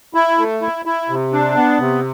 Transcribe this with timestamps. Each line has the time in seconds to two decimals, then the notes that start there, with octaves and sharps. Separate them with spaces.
0.14 E4
0.38 A3
0.62 E4
0.85 E4
1.09 C3
1.33 D4
1.56 B3
1.80 C3